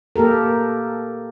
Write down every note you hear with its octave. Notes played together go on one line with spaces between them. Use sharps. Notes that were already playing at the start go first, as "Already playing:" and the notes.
A#3 G4 A4 A#4